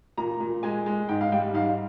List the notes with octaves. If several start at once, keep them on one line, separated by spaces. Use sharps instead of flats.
A#2 A#5
A#2
G#3 G#5
G#3
G#2 G5
F5
G3 G5
G#2 F5